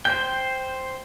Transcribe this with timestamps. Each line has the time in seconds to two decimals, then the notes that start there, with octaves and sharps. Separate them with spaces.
0.05 C5 G5 G6